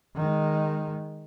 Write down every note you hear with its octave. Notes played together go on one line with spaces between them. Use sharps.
D#3 G#3